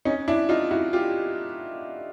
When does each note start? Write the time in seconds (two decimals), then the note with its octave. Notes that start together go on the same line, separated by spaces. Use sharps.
0.05 C#4 D#4
0.28 D4 E4
0.49 D#4 F4
0.71 E4 F#4
0.93 F4 G4